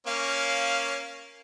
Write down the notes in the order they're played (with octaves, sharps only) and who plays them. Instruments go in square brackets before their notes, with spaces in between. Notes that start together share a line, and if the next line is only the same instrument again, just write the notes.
[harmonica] A#3 C#4 F5